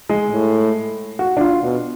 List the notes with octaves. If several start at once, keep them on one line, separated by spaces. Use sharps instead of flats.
G#3
A2
F#4
D4
F4
B2